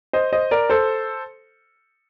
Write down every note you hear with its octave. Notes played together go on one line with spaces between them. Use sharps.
C5 D#5
C5 D#5
A#4 D5
A4 C5